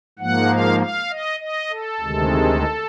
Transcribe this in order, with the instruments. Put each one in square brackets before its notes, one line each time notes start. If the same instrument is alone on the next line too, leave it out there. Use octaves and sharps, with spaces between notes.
[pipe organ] G#2 F3 A#3 F#5
F5
F5
D#5
D#5
A4
D2 C3 D#3 G#3